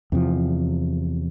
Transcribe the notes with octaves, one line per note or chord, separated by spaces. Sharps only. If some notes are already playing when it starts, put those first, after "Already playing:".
E2 C3 F3